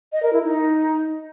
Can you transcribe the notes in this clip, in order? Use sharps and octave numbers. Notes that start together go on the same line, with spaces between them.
D#5
A#4
E4
D#4